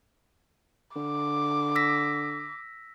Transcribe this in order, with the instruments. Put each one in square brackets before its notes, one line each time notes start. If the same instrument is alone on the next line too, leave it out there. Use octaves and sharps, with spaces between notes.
[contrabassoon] D3 [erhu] D6
[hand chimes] E6 A#6 B6